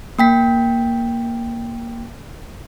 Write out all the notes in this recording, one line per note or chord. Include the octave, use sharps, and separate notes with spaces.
A#3 G5 B6